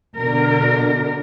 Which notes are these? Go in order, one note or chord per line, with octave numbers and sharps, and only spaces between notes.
B2 D3 A#4